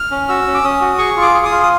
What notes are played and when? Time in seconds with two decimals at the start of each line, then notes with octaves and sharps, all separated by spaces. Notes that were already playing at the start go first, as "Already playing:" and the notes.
Already playing: F6
0.11 C#4
0.29 F#4 E6
0.47 C#4
0.54 D6
0.64 C#4 D#6
0.81 F#4
0.99 G#4 C#6
1.16 F4
1.22 D6
1.34 G#4
1.45 D#6
1.51 F4
1.63 D#6